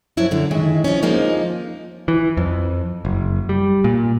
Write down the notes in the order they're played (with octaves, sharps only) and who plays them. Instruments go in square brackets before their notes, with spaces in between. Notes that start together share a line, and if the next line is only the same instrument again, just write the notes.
[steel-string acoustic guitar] F#2 F3 C#4 E4 F#5
F#2 D3
A2 D#3 G#3 E5
F3 C#4
F2 F3 G#3 A#3 D#4
[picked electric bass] E3
F2
F#1
G3
A#2